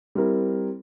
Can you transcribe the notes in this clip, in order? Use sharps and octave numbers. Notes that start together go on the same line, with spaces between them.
G3 C4 E4 A#4